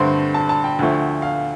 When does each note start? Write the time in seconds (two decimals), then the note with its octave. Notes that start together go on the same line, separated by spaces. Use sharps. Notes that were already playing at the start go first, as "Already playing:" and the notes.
Already playing: G2 D3 A3 C4 C6
0.34 A5
0.49 A5
0.64 G5
0.79 D2 D3 F3 A3
1.22 F5